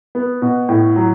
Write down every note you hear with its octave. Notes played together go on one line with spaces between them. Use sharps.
B3
B2
A2
F#3